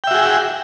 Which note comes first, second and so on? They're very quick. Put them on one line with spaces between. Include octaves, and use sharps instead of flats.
G5 E5 F#4 G#4